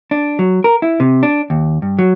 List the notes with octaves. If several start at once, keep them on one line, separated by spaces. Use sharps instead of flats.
D4
F#3
A#4
E4
C3
D4
D#2
G2
F#3